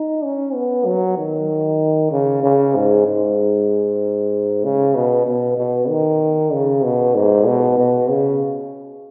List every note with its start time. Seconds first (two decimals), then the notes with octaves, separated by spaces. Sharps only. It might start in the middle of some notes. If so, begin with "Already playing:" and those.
Already playing: D#4
0.24 C#4
0.54 B3
0.86 F#3
1.17 D#3
2.11 C#3
2.43 C#3
2.75 G#2
3.06 G#2
4.64 C#3
4.95 B2
5.27 B2
5.57 B2
5.89 D#3
6.53 C#3
6.84 B2
7.15 G#2
7.47 B2
7.78 B2
8.10 C#3